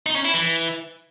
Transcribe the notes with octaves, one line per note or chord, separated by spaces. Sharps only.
D#4
C#4
E4
E3